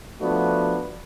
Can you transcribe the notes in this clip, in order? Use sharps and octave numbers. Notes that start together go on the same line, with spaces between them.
F3 A3 B3 D4 F#4